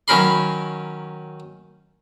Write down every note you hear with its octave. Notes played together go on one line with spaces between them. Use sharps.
D#3 F#3 C#4 A#4 B5 C6